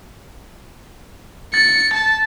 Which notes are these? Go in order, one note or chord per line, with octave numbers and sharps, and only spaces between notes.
A6 C#7
A5